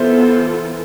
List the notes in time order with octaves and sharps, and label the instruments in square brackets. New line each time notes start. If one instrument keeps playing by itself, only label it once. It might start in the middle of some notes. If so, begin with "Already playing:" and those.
Already playing: [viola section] E3 B3 F4 A4 [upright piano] C5 E5